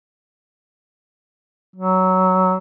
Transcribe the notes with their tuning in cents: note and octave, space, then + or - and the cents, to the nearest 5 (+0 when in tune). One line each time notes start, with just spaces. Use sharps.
F#3 +10